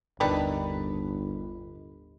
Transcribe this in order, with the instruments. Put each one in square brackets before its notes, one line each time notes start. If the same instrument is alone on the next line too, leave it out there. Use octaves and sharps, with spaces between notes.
[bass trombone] G1 [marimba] D#2 A2 [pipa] D#3 D4 B4